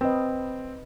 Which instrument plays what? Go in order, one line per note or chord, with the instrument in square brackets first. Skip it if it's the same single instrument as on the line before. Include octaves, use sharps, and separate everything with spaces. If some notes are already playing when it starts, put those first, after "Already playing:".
[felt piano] C4 [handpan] B4 D#5